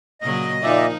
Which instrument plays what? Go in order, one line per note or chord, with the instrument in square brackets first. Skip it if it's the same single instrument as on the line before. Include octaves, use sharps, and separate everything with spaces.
[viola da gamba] A#2 C#3 F#3 [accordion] D#5
[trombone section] A#2 [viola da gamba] F3 D#4 [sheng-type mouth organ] D5 E5